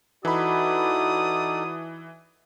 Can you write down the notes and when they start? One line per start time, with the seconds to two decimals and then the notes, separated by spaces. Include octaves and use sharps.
0.25 E3 D#4 F#4 A4 D5 B5 D#6